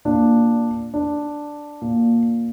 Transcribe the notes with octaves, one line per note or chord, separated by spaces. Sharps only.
A#2 D4
D4
A#2